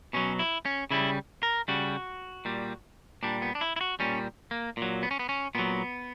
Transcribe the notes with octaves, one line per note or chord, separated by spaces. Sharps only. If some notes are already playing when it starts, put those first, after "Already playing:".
B2 F#3 C#4
E4
C#4
C#3 G3 E4
A#4
C#3 G3 F#4
A#2 G3
A#2 G3 D4
B3
D4
E4
E4
F#4
A#2 G3 C#4
A#3
A#2 F#3
B3
C#4
B3
C#4
A#2 F#3 B3